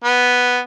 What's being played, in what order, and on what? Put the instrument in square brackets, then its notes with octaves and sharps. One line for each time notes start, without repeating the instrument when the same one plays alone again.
[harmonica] B3